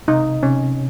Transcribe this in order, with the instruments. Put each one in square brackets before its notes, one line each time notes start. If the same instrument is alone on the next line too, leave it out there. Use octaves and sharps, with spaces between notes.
[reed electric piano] C3 [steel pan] D#4
[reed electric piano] C3 [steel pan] C#4